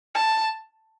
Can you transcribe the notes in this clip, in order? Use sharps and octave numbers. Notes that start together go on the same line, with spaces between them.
A5